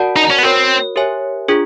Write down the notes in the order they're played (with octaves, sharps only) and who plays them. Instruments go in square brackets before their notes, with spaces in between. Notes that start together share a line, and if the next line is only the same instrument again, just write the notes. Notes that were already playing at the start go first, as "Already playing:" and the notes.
Already playing: [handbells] F#4 A#4 D5 F#5 A5
[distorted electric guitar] D#4
C#4
B3
[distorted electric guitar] C4 [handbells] F#4 A#4 C#5
[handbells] G4 A#4 C#5 E5 G#5
D4 F4 G#4